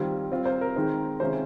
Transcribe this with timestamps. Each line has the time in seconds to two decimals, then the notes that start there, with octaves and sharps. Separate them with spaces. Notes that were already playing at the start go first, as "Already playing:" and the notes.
Already playing: D#3 G3 C4 F4
0.32 G3 C4 F4
0.45 C5
0.61 A#4
0.76 D#3 G#3 C4 D#4
1.20 C3 D#3 G#3 C#4 F4 C5